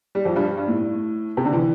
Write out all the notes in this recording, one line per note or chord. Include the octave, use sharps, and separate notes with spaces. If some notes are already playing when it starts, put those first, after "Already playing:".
G3
F2 F3
G2 G3
G2
A2
C3
D3
E3